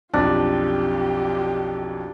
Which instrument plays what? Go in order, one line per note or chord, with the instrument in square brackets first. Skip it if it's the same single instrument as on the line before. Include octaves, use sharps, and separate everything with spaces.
[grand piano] B1 F2 F3 [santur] D4 [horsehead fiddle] F4 G4